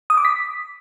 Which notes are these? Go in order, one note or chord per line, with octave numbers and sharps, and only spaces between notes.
D#6
D6
B6